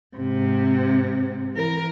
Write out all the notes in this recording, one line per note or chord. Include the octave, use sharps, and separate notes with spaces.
G#2 C3
E3 A#4